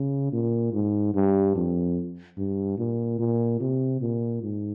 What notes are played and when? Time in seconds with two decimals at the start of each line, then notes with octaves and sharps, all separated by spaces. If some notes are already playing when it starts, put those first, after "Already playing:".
Already playing: C#3
0.32 A#2
0.73 G#2
1.15 G2
1.56 F2
2.38 G2
2.78 A#2
3.19 A#2
3.61 C3
4.01 A#2
4.43 G#2